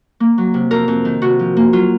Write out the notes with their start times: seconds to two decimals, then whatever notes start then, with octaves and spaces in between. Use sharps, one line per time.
0.20 A#3
0.38 F#3
0.54 C3
0.71 F2 A#4
0.88 F2
1.05 D#3
1.22 C3 F#4
1.39 F3
1.57 A#3
1.73 F#3 F4